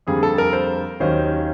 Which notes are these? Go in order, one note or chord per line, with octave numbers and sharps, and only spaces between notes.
F2 D3 G3 A#3 G#4
A4
A#4
C5
D#2 D#3 F#3 A#3 C#4 C5